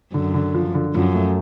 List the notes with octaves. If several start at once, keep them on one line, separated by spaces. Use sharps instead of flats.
F#2 D3
D3
F3
D3
F#2 F3
A3